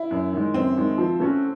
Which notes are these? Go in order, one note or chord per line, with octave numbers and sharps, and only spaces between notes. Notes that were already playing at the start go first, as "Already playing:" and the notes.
Already playing: E4
F#2
D#3 G#3
F#2 C4
D#3 G#3
F3
A3 C#4 F#4